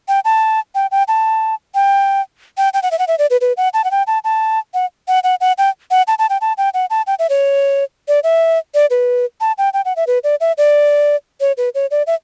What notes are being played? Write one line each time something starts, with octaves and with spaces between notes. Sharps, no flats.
G5
A5
G5
G5
A5
G5
G5
G5
F#5
E5
F#5
E5
D5
B4
B4
F#5
A5
F#5
G5
A5
A5
F#5
F#5
F#5
F#5
G5
F#5
A5
A5
G5
A5
G5
F#5
A5
G5
E5
C#5
D5
E5
D5
B4
A5
G5
G5
F#5
E5
B4
D5
E5
D5
C#5
B4
C#5
D5
E5